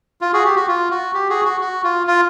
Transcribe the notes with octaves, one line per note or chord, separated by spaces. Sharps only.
F4
F#4 G#4
G4
F#4
F4
F#4
G4
F#4 G#4
F#4
F#4
F4
F4